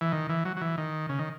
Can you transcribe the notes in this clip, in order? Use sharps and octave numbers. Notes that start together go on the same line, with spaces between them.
E3
D#3
E3
F#3
F#3
E3
D#3
C#3
D#3